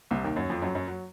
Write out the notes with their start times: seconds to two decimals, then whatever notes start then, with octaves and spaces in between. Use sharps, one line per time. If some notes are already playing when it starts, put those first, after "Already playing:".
0.11 C2 C3
0.24 D#2 D#3
0.36 F#2 F#3
0.50 F2 F3
0.62 F#2 F#3
0.75 F#2 F#3
0.88 F#3